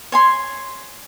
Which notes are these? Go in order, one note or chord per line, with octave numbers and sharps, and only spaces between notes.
C#5 G#5 C6